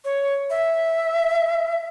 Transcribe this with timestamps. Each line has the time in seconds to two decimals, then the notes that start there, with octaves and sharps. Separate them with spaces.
0.04 C#5
0.50 E5